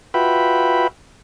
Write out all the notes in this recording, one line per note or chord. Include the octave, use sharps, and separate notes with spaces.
F4 F#4 B4 E5 G5 B5